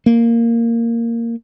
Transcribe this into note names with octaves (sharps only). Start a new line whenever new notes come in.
A#3